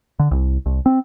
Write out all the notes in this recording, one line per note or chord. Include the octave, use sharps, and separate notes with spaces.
D3
C2
C2
C4